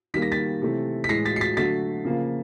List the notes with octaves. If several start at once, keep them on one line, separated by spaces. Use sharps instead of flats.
D#3 G3 A#3 B6
A#6
A6 B6
C3 E3 A3
B6
A2 E3 G#3 A#6 C7
A6 B6
C7
A6 B6
D3 F#3 A3 A6 B6
C#3 F3 A#3